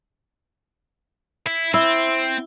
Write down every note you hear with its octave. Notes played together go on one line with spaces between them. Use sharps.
E4
C4 E4